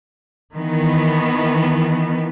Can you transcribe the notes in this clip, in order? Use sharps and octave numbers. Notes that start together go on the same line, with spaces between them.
D#3 E3 B3